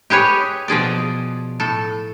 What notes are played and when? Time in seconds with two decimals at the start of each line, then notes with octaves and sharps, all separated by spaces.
0.10 G4 G#4 B4 C#5
0.68 B2 F3 G#4 D5
1.60 A2 A4